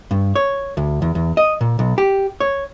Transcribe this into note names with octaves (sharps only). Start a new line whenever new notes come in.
G2
C#5
D2
E2
E2
D#5
A#2
B1
G4
C#5